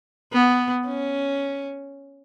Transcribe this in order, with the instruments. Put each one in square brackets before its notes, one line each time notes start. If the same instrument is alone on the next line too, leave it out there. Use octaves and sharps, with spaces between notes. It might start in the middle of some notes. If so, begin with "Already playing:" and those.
[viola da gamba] B3
C#4